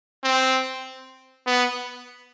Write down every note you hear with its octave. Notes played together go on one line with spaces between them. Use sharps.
C4
B3